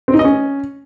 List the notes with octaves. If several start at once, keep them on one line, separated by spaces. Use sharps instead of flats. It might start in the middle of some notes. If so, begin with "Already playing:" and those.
C4
D#4
D#5
C#4